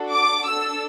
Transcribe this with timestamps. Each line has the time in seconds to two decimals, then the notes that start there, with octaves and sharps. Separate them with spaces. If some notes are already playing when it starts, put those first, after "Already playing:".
Already playing: D4 F#4 A4
0.12 D6
0.47 D4 A4 E6